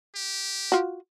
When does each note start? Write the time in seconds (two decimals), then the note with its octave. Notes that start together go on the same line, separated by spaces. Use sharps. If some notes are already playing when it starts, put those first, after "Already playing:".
0.15 G4
0.72 F4 F#4